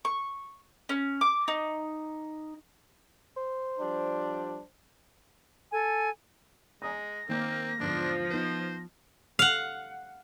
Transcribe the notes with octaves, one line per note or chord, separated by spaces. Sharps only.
C#6
C#4
D6
D#4
C5
F3 G3 D4
A4 G#5
G#3 G#5 A#5 D#6 A#6
D#3 A#3 C4 G6
E2 G#2 D3 F3 D4
B3 D#4 C5
F5 F#5